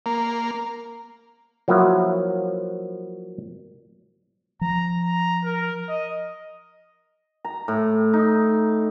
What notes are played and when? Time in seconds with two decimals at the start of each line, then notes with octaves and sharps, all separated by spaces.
0.06 A#3
1.68 F3 F#3 A#3 E4 F#4
4.61 F3 A#5
5.02 A#5
5.45 A#4
5.89 D#5
7.45 A#5
7.68 A2
8.13 D#4